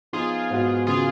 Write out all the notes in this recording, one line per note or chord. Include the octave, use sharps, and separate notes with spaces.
F3 B3 D#4 F4 G#4
G#2 F#3 B3 F#4
C#3 F#3 B3 F4 G#4